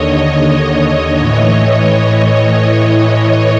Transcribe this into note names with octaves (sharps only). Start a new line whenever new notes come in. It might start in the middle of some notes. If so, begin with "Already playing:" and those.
Already playing: D#2 D3 C#5 D#5
A2 E3 C#5 D#5